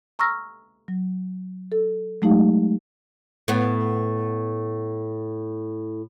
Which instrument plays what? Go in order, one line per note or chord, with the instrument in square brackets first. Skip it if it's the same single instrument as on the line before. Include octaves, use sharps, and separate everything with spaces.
[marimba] A#5 C#6 E6 F6 A#6
F#3
A4
F#3 G#3 A3 D#4 G4 F5
[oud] A2 B3